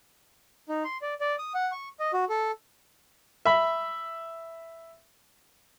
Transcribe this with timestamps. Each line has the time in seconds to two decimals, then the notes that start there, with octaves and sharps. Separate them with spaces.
0.69 D#4
0.85 C6
1.02 D5
1.21 D5
1.39 D#6
1.54 F#5
1.72 C#6
2.00 D#5
2.13 F#4
2.29 A4
3.45 E5 B5